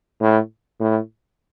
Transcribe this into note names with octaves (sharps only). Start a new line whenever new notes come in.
A2
A2